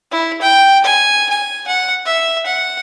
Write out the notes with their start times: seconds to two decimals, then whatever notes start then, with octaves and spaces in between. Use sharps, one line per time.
0.11 E4
0.42 G5
0.84 G#5
1.30 G#5
1.68 F#5
2.06 E5
2.46 F#5